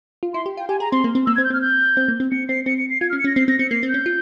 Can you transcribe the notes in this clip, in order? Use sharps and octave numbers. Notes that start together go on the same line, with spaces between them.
F4
E4 C6
G4
F4 G5
G4 G#5
G#4 A#5
C4 C6
A#3
C4
A#3 E6
C4 G#6
G6
C4 F6
G6
C4
A#3
C4
C4 C#7
C4 C7
C4 C#7
C#7
C7
F4 G#6
F6
C#4
C#7
C#4 A#6
C4 C7
C4 A#6
C4 C#7
A#3 C7
C4
C#4 G6
F4